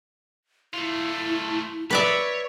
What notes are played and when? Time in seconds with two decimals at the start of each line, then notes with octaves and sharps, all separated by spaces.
0.74 A3 E4 F4
1.91 B4 C#5 D5 E5